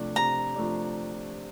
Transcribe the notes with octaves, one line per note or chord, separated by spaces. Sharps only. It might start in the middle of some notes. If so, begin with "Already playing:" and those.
Already playing: C3 F3 A3 D4
C3 A#5
F3 A3 D4